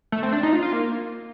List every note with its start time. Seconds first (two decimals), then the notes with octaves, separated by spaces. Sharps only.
0.12 A3
0.23 C4
0.32 D4
0.43 D#4
0.53 F4
0.63 F4
0.73 A#3